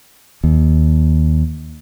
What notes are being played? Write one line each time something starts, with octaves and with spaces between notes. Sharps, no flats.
D#2